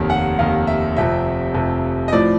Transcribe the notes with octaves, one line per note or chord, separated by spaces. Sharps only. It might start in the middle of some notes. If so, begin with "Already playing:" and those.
Already playing: F1 D#2 D#3 F5
F#5
F1 D#2 D#3 F5
E5
F1 F2 C3 E5
F1 F2 C3
D#5
A2 F3 D5